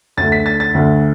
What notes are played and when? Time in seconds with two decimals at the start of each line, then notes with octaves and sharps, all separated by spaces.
0.17 D2 D3 A3 A6
0.32 B6
0.46 A6
0.60 A6
0.75 D2 D3 A3